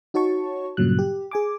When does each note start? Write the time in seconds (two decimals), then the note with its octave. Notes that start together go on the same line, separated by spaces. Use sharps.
0.14 D#4 F#4 C#5 A5 C#6
0.77 G2 A#2 C#3 F#3 F#6
0.99 G4
1.31 G#4 G#5 D6